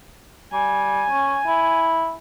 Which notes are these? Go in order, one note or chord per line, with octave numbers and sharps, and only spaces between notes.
G3 G#5
C#4
E4